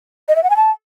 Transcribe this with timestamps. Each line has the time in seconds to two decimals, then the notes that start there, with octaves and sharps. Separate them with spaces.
0.29 D#5
0.36 E5
0.43 F#5
0.50 G#5
0.56 A5